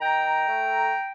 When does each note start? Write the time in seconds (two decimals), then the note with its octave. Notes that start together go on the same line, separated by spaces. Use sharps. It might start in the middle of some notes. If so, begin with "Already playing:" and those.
0.01 D#3 G5 A#5
0.48 A3